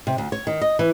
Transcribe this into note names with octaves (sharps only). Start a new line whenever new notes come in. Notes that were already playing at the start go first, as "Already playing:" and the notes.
C3
D2
C#5
D#3
D#5
E3